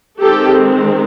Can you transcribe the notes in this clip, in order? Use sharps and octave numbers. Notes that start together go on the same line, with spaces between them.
D#3 G#3 C4 G4 A4